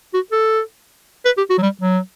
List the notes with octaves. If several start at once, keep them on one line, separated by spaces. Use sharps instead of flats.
F#4
A4
B4
G4
F#4
F#3
G3
F#3